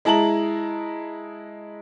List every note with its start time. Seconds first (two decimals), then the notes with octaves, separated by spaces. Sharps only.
0.05 G#3 E4 A5 A#5 F#7